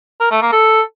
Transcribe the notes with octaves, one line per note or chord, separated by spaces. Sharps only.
A#4
A3
A#3
A4